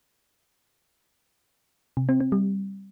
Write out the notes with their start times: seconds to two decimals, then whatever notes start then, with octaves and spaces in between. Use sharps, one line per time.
1.97 C3
2.09 C4
2.20 C4
2.32 G3